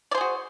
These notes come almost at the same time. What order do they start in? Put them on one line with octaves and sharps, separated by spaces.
D5 C5 G#4 F#4